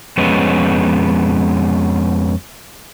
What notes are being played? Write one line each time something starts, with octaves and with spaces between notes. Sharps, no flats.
F2 G#3 B3 C#4